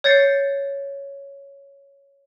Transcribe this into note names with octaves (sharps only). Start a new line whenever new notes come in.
C#5 G6 A6 C7 C#7